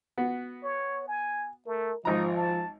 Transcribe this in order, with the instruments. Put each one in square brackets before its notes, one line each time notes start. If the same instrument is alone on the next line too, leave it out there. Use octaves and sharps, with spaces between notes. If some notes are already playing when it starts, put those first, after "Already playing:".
[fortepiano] B3 F#4
[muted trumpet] C#5
G#5
[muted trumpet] A3 [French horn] A#4
[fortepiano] G#1 A#5 [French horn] F3 [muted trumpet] D#4
[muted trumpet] A5